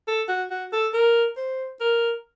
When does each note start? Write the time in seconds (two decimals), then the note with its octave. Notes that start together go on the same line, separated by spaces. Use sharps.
0.08 A4
0.28 F#4
0.50 F#4
0.73 A4
0.94 A#4
1.37 C5
1.80 A#4